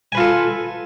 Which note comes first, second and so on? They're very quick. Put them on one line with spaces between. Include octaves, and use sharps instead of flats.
G#5 B4 F4 A4